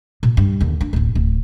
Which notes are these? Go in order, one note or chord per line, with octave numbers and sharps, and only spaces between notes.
A#2
G2
D#2 D3
D4
D1 A1
D1